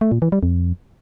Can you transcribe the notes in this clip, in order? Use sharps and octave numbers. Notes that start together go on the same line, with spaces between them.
A3
A#2
E3
G3
F2